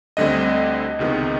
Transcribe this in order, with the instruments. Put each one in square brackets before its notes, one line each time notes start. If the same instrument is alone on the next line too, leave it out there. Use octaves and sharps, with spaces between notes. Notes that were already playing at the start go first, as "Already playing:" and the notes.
[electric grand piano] D2 D3 G3 C4 D#5
C#2 C3 D#3 G#3 B3